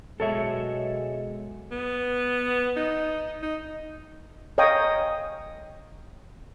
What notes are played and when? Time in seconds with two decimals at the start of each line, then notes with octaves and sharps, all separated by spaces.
0.20 B2 F#3 G#3 A4 C#5 E5
1.71 B3
2.76 D#4
3.42 D#4
4.58 C#5 D#5 F5 G5 A#5 D#6